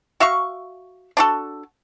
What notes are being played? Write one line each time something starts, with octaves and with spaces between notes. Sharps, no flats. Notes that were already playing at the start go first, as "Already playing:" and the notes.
F#4 E5 F5 C#6
D4 F#4 A4